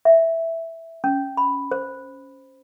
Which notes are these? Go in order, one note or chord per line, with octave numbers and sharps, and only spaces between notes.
E5
C#4
B5
C5